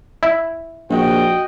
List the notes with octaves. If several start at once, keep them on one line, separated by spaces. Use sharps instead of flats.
E4
A#1 F#4 D#5 G5